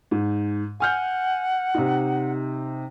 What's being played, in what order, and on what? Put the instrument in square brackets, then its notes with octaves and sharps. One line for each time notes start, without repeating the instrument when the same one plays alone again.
[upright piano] G#2
[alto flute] F#5 [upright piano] G#5 F6 G6
[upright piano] C3 D#4